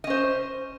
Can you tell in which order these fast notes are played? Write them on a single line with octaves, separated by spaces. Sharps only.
D#5 C#4 C5